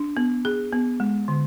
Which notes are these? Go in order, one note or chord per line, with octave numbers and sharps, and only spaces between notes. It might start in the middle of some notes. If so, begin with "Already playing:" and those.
Already playing: D4
B3
G#4
B3
G#3
D3